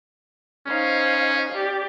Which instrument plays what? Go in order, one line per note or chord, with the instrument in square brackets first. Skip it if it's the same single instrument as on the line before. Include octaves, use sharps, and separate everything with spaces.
[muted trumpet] C#4 [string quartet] D#4 C5 F5
[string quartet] G4 D5